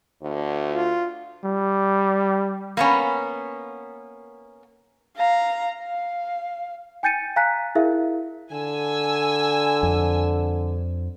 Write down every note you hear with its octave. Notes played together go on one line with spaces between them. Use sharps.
D2
F4
G3
A#3 B3 C#4
F5 A#5
F5
G5 G#5 G6 A6 C#7 D#7
F5 G#5 A#5 F#6 B6
E4 G#4 A#4 E5 F5
D3 G#5 E6
F2